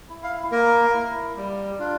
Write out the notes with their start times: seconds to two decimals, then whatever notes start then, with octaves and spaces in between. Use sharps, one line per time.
0.09 E4
0.23 F5
0.51 A#3 A#4
0.94 E4
1.37 G3
1.79 D4 F4